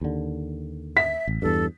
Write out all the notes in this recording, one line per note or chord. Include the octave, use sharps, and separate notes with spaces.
D#2 D3
E5 B6
A1
E2 G2 A4